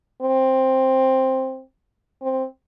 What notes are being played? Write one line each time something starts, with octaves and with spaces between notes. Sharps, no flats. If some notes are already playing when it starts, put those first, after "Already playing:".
C4
C4